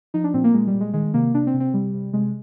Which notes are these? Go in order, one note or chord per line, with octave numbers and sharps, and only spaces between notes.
F3 D#4
D4
A#2 C4
A#3
A#2 G#3
G3
A#2
G#3
D#3 G#3
C3 A#3
C3 D4
C4
C3
C4
C3 G3
C3
C3 G#3